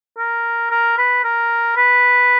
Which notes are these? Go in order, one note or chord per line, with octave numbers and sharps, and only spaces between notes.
A#4
A#4
B4
A#4
B4